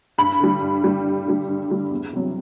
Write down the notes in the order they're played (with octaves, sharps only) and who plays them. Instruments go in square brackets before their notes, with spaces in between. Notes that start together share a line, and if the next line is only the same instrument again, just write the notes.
[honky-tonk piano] G2 B5
D3 G3
G2
D3 G3
G2
D3 G3
G2
D3 G3
E2
C3 F#3